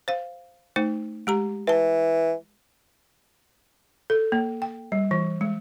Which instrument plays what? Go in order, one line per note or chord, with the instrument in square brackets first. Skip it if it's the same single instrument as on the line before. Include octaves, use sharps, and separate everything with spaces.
[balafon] C5 F5
A3 D#4 C5
G#3 G4 A#5
[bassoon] E3 [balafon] B4 A5
[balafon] A4
A#3
G5
G3
E3
G#3